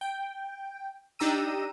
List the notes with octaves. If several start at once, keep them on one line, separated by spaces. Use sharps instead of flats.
G5
D4 D#4 G4 A#5 E6 D#7